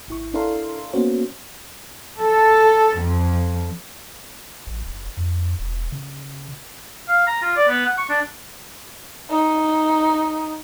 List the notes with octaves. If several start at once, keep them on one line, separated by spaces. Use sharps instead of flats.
G#1 E4 C#6
D4 E4 A4 A#4 F5 C6
A#3 B3 C#4 F#4 C5 C#5
A4
F2
A1
F#1
F2
E1
C#3
F5
A#5
F4
D5
B3
F#5
C#6
D4
D#4